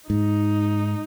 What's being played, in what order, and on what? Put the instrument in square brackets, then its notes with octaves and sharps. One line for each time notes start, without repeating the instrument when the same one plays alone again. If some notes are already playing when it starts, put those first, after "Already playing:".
[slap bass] G#2 [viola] D#4